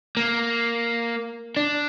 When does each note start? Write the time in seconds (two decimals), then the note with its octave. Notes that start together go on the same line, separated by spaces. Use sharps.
0.17 A#3
1.57 D4